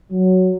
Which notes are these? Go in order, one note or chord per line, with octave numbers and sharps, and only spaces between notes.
F#3